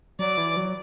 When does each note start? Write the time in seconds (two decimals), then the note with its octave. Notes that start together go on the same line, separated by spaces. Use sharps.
0.19 F#3 D5
0.38 E3
0.57 F#3